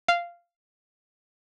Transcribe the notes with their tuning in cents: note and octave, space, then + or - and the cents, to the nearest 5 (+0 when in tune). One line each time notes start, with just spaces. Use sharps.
F5 -10